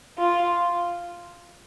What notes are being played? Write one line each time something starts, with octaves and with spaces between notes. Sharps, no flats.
F4